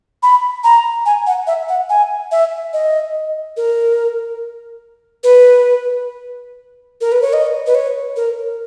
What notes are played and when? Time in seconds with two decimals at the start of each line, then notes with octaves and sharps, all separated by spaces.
0.23 B5
0.64 A#5
1.06 G#5
1.27 F#5
1.47 E5
1.69 F#5
1.90 G#5
2.31 E5
2.73 D#5
3.57 A#4
5.24 B4
7.01 A#4
7.12 B4
7.22 C#5
7.33 D#5
7.66 B4
7.75 C#5
8.16 A#4